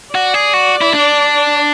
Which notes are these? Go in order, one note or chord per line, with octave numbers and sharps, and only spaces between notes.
F#4 D5
G#4
F#4
E4
D4